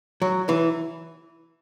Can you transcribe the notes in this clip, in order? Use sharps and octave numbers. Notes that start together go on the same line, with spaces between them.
F#3
E3